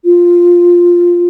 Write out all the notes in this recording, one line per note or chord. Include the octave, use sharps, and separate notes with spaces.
F4